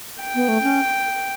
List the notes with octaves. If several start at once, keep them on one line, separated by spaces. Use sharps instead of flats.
G5
B3
A3
C#4